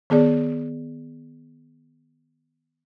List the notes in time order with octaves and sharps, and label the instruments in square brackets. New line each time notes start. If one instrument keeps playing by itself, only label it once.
[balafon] D#3 B3 G#4 D5